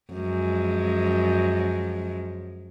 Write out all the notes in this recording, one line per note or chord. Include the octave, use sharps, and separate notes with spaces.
F#2 F3 G#3